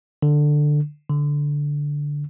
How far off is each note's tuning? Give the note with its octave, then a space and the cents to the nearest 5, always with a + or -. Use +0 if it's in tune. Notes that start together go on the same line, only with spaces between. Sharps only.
D3 +10
D3 -10